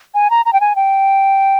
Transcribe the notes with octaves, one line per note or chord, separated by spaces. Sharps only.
G#5
A#5
A#5
G5
G#5
G5